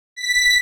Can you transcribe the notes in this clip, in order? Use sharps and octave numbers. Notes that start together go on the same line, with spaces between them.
B6